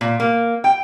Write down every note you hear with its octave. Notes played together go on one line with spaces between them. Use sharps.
A#2
A#3
G5